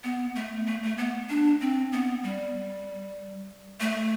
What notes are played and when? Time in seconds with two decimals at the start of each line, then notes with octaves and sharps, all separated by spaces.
0.04 B3
0.36 A3
0.66 A3
0.83 A3
0.97 B3
1.29 D4
1.61 C4
1.92 B3
2.24 G3
3.80 A3